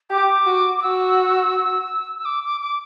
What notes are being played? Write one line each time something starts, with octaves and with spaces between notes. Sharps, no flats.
G4 D6
F#4
D6
F#4 E6
E6
D6
D6
D6